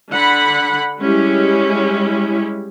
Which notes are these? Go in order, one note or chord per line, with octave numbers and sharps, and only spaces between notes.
D3 F#5 B5
G3 G#3 C#4 E4 G4